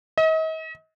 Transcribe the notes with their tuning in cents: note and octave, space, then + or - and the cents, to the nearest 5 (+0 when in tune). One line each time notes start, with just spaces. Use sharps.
D#5 +40